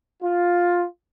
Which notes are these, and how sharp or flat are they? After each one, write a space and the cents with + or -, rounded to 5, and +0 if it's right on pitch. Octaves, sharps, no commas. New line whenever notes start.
F4 +10